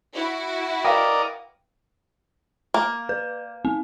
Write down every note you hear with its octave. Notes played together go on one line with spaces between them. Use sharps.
E4 F#4
A#4 B4 D5 D#5 F5 G5
A#3
B4
C4